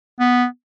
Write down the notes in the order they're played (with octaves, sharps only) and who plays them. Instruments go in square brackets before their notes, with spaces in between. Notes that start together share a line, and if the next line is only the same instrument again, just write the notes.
[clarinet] B3